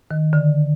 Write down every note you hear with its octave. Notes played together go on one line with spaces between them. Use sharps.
D#3
D3